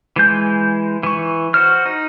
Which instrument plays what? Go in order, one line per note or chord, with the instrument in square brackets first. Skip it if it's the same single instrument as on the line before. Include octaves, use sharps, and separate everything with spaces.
[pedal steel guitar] E3 G#3 G6
E3 C#6
F#4 C5 F6
D#4